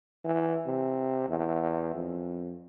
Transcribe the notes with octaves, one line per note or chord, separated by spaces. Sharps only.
E3
C3
E2
F2